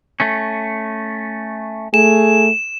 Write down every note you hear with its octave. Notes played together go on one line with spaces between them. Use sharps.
A3 C#4
A3 G#4 E7